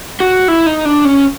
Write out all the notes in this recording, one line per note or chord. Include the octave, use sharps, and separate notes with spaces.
F#4
E4
D#4
D4
C#4